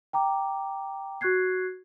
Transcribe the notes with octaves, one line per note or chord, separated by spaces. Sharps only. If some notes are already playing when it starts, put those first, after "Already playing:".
G5 A#5 D6
F#4 C#6 F#6 G#6 C7